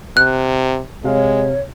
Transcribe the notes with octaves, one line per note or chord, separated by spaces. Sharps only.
C3 F#6
C3 G#3 C#5 F5